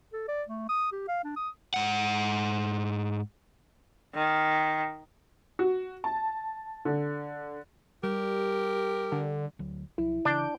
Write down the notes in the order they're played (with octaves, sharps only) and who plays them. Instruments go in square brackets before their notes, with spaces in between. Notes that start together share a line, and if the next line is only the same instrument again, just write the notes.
[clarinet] A4
D5
A3
D#6
G4
F5
D4
D#6
[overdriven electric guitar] G#2 F#5
[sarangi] D#3
[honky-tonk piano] F#4
A5
D3
[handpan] G3 [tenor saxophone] G4 [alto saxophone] A#4
[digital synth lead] D3
[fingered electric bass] D2 F#3
[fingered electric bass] B1 F3 [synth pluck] E4
[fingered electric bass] C#3 E3 [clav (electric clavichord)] D4 [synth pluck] G6 D7